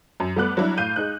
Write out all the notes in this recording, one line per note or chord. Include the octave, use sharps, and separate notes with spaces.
F#2
G3 A3 B3 D6 F#6
F#3 G3 D4 E4
A2 F5 G6 D#7
G#3 D#4 F#6